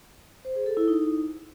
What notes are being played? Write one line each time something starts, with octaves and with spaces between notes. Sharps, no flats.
C5
G#4
A4
E4
D#4